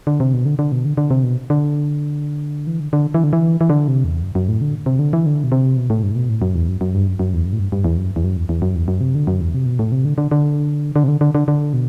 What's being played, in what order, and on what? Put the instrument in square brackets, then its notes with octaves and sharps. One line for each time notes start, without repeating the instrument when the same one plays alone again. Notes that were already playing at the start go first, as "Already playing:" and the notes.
[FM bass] D3
C3
B2
D3
D3
B2
D3
D3
C3
B2
D3
E3
D3
D3
E3
D3
E3
E3
D3
C3
E2
F#2
F#2
A2
D3
C3
D3
E3
D3
B2
C3
B2
A2
G2
A2
B2
A2
F#2
E2
F#2
F#2
G2
F#2
F#2
E2
F#2
A2
G2
G2
E2
F#2
E2
F#2
E2
E2
F#2
E2
F#2
C3
D3
F#2
E2
C3
B2
A2
C3
D3
D3
D3
D3
C3
D3
D3
D3
D3
B2